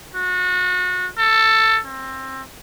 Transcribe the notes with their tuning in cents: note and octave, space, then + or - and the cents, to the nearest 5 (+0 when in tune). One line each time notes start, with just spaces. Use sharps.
F#4 -30
A4 +10
C4 +20